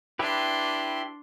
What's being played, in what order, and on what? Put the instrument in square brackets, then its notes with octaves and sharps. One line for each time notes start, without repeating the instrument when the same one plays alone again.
[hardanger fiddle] D4 C6 [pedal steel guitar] E4 G4 B4